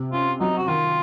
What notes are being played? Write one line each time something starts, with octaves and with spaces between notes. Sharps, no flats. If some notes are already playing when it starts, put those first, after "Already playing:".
Already playing: C3
C#4 F4
F#3 D#4
F#4
D#3 F4